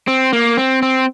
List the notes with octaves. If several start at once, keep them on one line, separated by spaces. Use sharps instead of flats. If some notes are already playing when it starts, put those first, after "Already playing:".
C4
A#3
C4
C4